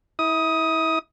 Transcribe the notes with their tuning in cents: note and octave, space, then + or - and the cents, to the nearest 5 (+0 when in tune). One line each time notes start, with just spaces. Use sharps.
E4 -30 D#6 +10